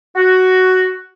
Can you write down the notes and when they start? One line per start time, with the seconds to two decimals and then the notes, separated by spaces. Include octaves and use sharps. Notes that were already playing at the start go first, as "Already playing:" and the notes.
0.16 F#4